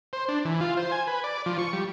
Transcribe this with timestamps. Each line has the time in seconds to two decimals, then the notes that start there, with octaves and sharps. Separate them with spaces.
0.13 C5
0.28 D4
0.45 E3
0.61 F4
0.77 C5
0.92 G#5
1.07 B4
1.24 D5
1.46 F3
1.59 C#6
1.73 G3